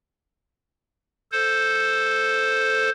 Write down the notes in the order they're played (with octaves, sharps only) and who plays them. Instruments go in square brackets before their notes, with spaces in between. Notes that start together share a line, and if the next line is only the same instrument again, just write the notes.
[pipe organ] A4 C5